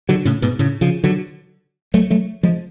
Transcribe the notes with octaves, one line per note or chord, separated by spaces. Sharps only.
D3 F#3
A2 C#3
G#2 B2
A2 C#3
C#3 F3
D3 F#3
F#3 A3
F#3 A3
F3 G#3